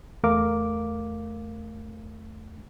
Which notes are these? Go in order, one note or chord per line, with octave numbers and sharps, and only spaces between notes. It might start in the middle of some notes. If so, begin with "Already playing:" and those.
E2 A3 A#4 F5 D6